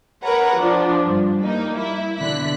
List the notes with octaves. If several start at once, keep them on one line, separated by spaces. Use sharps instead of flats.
A#4 B4 C#5 F#5 A#5
F3 D4
G2
G3 A#3 D#4
E4
B2 D3 F#6 B6